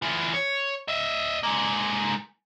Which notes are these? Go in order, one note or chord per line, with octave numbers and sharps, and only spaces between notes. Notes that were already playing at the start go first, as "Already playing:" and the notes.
E3 F4
C#5
D#5 E5
G#3 A#3